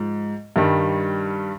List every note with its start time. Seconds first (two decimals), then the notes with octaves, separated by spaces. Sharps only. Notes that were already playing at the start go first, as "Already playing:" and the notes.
Already playing: G#2 F3
0.56 G2 D#3 G3